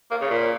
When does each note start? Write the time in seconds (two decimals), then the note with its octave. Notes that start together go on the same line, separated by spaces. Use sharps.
0.11 A#3
0.21 C#3
0.30 A#2